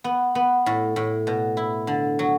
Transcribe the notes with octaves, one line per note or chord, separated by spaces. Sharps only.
B3
B3
A2
A2
B2
E4
D3
F#3